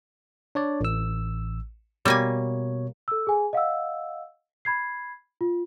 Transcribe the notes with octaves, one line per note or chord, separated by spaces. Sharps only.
D4 C#5 D5
A1 E6
B2 G3 A#3 C#5 G#5
A4 E6
G#4 G#5
D#5 F5 F#5 E6
B5 G#6 C7
F4